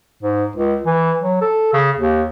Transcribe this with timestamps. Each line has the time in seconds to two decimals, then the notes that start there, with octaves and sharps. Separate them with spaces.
0.23 G#2
0.56 C#2
0.86 E3
1.22 F#3
1.41 A4
1.73 C#3
1.98 D#2